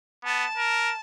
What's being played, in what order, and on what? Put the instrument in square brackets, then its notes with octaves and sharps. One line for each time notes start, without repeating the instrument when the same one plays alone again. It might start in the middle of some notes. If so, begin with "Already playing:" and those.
[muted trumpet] B3 [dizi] A5
[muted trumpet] A#4